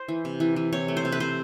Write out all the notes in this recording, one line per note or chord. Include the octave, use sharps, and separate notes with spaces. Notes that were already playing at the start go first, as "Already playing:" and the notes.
Already playing: C5
E3
C3
E3
E3
C3 C#5
A3
C5
C3
B4
C3 C5